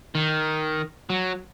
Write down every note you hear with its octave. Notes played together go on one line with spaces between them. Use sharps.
D#3
F#3